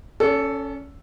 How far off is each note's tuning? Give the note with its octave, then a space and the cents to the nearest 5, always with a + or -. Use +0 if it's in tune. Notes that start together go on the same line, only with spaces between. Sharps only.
C#4 +0 A4 +0 D5 -45